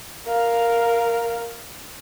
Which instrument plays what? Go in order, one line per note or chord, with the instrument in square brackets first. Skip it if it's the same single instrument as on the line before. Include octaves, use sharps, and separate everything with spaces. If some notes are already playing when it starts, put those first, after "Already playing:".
[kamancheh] A#4 F5